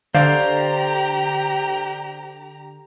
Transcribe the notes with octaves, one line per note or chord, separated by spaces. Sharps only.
D3 G4 C5 D5 F5 A#5